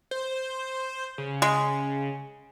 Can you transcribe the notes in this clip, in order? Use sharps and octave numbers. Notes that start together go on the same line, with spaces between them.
C5
C#3
G#3